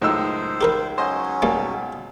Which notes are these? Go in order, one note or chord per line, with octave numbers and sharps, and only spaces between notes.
C#2 F#2 A2 A3 D#4 C5 E6
G4 A#4 B4
F#3 C#4 C5 D#5 C6
B2 G3 A#3 B3